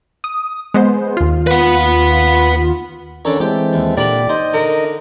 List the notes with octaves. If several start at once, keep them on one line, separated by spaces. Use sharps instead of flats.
D#6
G#3 B3 C5
D#2 F4
B4 F#5
D3 C#4 D4 A4 A#4 C#5
E3 G#3 A3 C4 G4
D#2
A#2 D3 G4 A#4 D5 B5
D#4 C5 D#5
D3 A#4